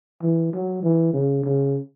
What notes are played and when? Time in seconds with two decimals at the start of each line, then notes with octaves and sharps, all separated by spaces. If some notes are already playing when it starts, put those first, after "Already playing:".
0.22 E3
0.53 F#3
0.83 E3
1.13 C#3
1.44 C#3